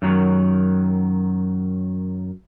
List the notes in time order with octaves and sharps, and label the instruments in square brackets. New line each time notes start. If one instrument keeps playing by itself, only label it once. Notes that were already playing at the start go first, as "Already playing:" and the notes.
[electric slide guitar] F#2 D#3 F#3